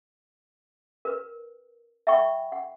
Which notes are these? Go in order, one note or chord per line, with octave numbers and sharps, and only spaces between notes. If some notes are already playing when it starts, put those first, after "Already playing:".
A#4 B4
E5 F#5 G5 B5 C#6
F#5